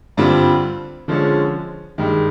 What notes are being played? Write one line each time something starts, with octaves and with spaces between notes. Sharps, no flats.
G2 D3 G3 C4 F4
D3 F3 G#3 C#4
G2 D#3 G#3